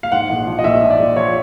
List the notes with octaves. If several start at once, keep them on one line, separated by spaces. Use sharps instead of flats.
F5
G#2 F#5
A#1
F3
D#5
A#1 E5
G#2
D5
A#1
F3 C#5